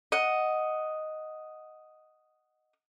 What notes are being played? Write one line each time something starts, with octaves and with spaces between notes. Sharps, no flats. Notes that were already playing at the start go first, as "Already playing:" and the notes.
D#5 F#5